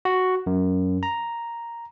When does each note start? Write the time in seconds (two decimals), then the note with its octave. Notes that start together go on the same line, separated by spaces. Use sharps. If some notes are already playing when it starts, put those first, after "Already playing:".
0.05 F#4
0.47 F#2
1.03 A#5